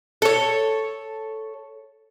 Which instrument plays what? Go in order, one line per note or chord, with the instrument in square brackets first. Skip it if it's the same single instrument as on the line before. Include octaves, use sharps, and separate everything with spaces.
[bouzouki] A4 C#5